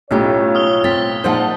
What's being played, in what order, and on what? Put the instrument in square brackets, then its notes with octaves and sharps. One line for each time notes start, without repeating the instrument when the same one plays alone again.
[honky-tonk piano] B1 A2 [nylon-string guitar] C#4 D#4 G4 [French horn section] F4 C#5
[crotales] D#6 F6 G7
[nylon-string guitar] C4 [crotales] A6 B6
[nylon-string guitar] A#2 F3 G#3 [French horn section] D#4 [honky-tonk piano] C5 F#5 A5